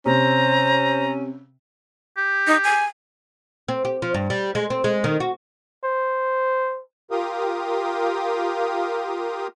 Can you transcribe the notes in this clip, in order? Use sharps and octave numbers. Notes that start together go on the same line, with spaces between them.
C3 C#4 C5 A#5
G4
D#4
G#5
C4
G4
F3
G2
G3
G#3
C4
G#3
D#3
F#4
C5
F4 G4 A#4 F5 G5 D#6